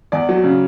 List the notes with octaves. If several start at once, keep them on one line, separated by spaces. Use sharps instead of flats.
E2 D5
F#3
C#3